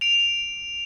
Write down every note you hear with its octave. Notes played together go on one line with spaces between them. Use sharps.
D7 F7